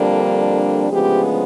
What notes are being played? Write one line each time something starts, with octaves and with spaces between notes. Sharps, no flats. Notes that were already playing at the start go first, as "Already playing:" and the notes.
Already playing: F2 D3 G3 A#3 D4
D2 C#3 F3 G#3 B3 G4